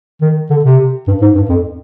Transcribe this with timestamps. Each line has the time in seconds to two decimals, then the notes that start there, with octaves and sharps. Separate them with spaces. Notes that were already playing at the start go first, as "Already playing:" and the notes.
0.21 D#3
0.50 D3
0.65 C3
1.07 G2
1.22 G#2
1.35 G2
1.49 F2